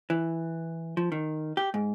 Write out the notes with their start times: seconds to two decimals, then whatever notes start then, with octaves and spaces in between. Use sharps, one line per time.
0.10 E3
0.97 F3
1.12 D#3
1.57 G4
1.74 G#2